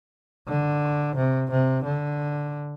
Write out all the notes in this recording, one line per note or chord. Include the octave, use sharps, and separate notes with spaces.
D3
C3
C3
D3